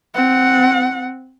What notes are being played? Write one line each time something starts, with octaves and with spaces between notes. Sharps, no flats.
C4 F#5